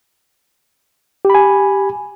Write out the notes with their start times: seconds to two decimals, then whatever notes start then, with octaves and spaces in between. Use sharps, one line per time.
1.25 G4
1.30 B5
1.35 G#5